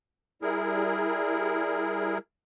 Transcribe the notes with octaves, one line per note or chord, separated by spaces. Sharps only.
G3 E4 G#4 A#4